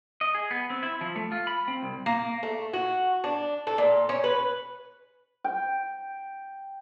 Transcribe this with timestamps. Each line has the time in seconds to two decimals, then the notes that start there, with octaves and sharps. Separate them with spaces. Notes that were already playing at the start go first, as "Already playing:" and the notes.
0.21 D#5
0.35 G#4
0.51 B3
0.70 C4
0.83 E4
1.01 F3
1.16 A3
1.32 F4
1.47 B5
1.68 C4
1.83 C2
2.06 A#3
2.43 A3
2.73 F#4
3.24 D4
3.67 A4
3.78 A#2
4.09 C#4
4.24 B4
5.44 G5